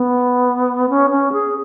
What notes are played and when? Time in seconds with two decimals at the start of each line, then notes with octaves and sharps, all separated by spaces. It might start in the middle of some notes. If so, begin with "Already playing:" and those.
Already playing: B3
0.90 C#4
1.10 C#4
1.32 G#4